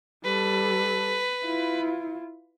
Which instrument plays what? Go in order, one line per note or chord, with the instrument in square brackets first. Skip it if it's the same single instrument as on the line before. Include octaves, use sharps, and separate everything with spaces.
[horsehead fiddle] G3 A4 [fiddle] B4
[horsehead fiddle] E4 F4